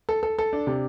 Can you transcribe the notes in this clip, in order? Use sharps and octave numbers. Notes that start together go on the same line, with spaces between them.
A4
A4
A4
D4
C3